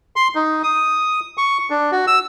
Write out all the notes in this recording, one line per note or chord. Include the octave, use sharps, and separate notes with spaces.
C6
D#4
D#6
C#6
D4
F#4
E6